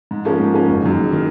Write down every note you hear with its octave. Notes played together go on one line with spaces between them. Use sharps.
G#2
F3 A#3 C#4
G#2
F3 A#3 C#4
F#1
F#2 D#3
F#1
D#3